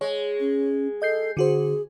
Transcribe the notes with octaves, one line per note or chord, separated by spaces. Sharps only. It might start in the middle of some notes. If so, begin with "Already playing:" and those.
G#3 C#5
C#4
A4 D#5 G6 C7
D3 F#4 G#4 C5